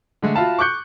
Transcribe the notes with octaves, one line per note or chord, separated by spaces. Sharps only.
D3 G#3 A3
F4 F#4 E5 F5 A5 B5
C#6 D6 F#6 G6 C#7